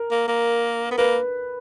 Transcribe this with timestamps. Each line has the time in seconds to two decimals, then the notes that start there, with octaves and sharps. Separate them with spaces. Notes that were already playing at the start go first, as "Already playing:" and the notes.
Already playing: A#4
0.11 A#3
0.28 A#3
0.91 B3
0.98 A#3 B4